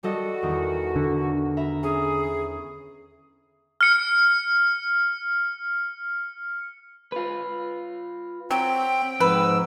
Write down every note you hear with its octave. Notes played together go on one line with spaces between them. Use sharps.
G3 F#4 A4 D#5
E2 D#3
D3
E5 A#5 B5
C#4 G#4
F6 C#7
F4 B4
F#3 C4 G5
F2 G#2 B4 E6